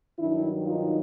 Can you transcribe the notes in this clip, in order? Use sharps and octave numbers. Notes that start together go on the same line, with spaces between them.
G2 D#3 F#3 D4 E4
D#4 F4